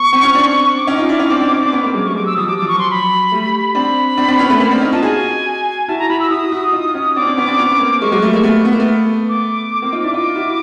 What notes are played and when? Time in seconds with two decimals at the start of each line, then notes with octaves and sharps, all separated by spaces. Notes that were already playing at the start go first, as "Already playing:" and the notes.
Already playing: B3 C#6
0.13 C4
0.23 C#4
0.35 C4 D4
0.76 D6
0.87 C#4 D#4
0.98 D#4 F4
1.09 D4 E4
1.19 C#4 D#4
1.30 C4 D4
1.40 C4 D4
1.51 C#4 D#4
1.63 C4 D4
1.72 B3 C#4
1.83 A#3 C4
1.94 F#3 G#3
2.05 G3 A3 C#6
2.15 F#3 G#3 D6
2.26 E6
2.37 F3 G3 D#6
2.47 F#3 D6
2.58 F3 D6
2.68 C#6
2.75 F#3 C6
2.90 B5
3.32 G3 A3
3.75 C4 D4 B5
4.17 C4 D4
4.28 C4 D4
4.39 B3 C#4
4.46 C4
4.50 A3 B3
4.60 A#3 C4
4.71 C4 D4
4.81 C#4 D#4
4.92 D#4 F4 A5
5.02 F#4 G#4 G#5
5.88 E4 F#4 A5
5.99 A#5
6.09 E4 F#4 B5
6.20 E6
6.30 E4 F#4 D#6
6.52 E4 F#4
6.73 D#4 F4
6.95 C#4 D#4
7.16 C4 D4 D6
7.22 C#4
7.27 C4 D4
7.37 B3 C#4
7.47 C4 D4
7.58 B3 C#4
7.80 A#3 C4
8.01 G#3 A#3 C#6
8.12 F#3 G#3
8.22 G3 A3
8.33 G#3 A#3
8.43 A3 B3
8.65 B3
8.73 A#3
8.80 A3 B3
9.29 D6
9.82 A#3 C4
9.92 D#4 F4
10.03 D4 E4
10.14 D#4 F4 D6
10.36 E4 F#4